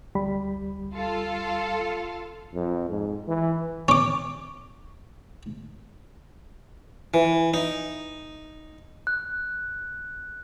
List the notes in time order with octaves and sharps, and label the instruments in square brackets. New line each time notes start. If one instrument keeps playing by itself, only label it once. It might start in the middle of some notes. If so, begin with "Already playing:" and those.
[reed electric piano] D2 G3 B5
[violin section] F4 A4 F5
[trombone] F2
G#2
E3
[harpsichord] C#4 D6
E3
D#4
[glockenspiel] F#6